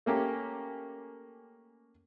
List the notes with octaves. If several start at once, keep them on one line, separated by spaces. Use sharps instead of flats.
A3 A#3 C#4 G4